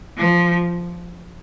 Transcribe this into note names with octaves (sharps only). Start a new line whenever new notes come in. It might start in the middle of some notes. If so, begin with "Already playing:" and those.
F3